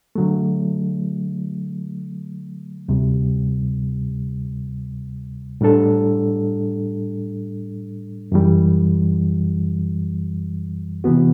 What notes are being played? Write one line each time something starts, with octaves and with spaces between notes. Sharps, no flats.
D3 F#3 A3
D2 C3 G3
A2 G3 D4 A4
F#2 E3 G3
C3 E3 B3 F#4